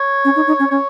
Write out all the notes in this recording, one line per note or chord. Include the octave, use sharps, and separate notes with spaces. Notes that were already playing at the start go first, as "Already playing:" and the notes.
Already playing: C#5
C#4
D#4
D#4
C#4
C#4 C#5